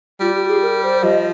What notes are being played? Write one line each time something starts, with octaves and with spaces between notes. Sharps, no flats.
G3 F4
G4
G#4
A#4
C5
F3 D#5